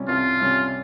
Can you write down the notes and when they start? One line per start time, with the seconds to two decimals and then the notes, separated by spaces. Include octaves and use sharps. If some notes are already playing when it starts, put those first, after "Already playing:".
Already playing: C3 G3 C#4
0.08 C2 F4
0.39 C3 G3 C#4